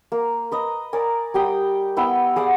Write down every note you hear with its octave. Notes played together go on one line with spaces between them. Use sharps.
A#3
B4 D#5 A#5
A#4 D5 G#5
G3 G4 G5 D#6
B3 E4 G5 B5
G#4 D5 F5 F#5